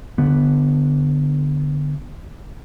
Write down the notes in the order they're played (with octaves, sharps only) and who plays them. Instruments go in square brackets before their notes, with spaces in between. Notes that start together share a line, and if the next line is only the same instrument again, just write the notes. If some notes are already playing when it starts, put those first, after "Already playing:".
[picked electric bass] D3 B3